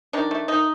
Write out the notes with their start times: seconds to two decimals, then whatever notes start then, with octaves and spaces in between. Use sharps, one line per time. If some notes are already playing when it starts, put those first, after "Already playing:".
0.13 D#3 D4
0.31 A3
0.48 D#3 D#4